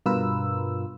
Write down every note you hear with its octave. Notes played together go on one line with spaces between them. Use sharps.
G2 B2 F4 A#4 B4 E6